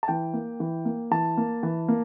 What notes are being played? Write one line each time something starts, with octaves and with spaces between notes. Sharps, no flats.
A5
E3 G5
A#3
E3
A#3
E3 A5
A#3
E3
A#3